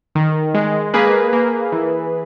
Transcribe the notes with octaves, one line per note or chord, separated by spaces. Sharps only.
D#3
G#3
A#3 G#4 B4
A#3
E3